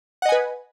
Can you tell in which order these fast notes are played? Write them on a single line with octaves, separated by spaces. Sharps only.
F#5 D#5 G#5 B4